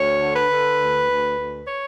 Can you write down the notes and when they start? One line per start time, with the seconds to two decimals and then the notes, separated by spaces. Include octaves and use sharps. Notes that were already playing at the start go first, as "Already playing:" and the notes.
Already playing: D2 C#5
0.22 D3
0.36 B4
0.51 D3
0.79 D2
1.09 D2
1.37 D2
1.67 C#5